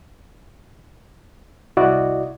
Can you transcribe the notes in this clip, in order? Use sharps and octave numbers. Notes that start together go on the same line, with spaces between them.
C2 E4 F#4 D5 D#5